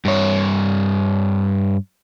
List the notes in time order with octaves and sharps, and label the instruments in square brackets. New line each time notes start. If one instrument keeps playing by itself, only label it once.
[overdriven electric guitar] G2 C#5